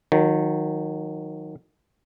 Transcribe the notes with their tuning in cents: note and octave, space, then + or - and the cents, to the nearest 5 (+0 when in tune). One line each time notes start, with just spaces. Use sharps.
D#3 +0 F#3 -30